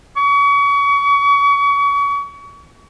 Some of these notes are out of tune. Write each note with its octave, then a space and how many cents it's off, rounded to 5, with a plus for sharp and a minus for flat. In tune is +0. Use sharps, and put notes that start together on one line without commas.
C#6 +35